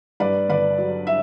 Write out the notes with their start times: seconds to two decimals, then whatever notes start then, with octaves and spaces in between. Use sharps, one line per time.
0.20 G2 B4 D5
0.49 G1 B4 D5
0.78 F#3
1.07 E5